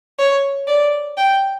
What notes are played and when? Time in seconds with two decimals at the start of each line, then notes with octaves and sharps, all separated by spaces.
0.19 C#5
0.67 D5
1.17 G5